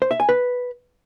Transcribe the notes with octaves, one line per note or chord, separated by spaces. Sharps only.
C5
E5
G#5
B4